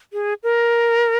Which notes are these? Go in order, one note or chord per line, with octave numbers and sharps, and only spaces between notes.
G#4
A#4